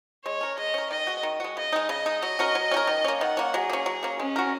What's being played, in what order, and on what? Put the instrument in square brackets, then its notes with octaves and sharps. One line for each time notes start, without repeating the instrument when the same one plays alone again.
[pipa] G#3 [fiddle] C#5
[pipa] C#4 A#4
[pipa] G#3 [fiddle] D#5
[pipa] C#4 A#4
[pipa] D#3 [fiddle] D#5
[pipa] G#3 F#4
D#3
G#3 F#4
[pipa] C#3 [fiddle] D#5
[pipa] G#3 D#4
[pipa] C#3 [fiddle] D#5
[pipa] G#3 D#4
[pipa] F#3 [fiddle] D#5
[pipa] C#4 F#4 A#4
F#3
C#4 F#4
A#4
D#3
A#3 C#4
[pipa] D#3 [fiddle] F#5
[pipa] A#3 C#4
[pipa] F#3 [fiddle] G#4
[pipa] A#3 C#4
F#3
A#3 C#4
[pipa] G#3 [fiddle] C#4
[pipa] F#4 A#4